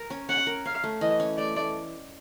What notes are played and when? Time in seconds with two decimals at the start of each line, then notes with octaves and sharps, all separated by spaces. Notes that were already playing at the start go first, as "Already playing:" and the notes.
Already playing: A#4
0.10 C#4
0.29 C#4 F#5
0.47 A#4
0.65 C#4 F5
0.84 A3
1.01 E3 D#5
1.20 C#4
1.38 A3 D5
1.56 A3